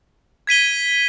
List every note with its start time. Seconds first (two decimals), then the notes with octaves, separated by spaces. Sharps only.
0.47 G#6 B6 D#7 G7